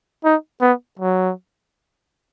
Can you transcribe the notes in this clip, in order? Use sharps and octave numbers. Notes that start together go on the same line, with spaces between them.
D#4
B3
F#3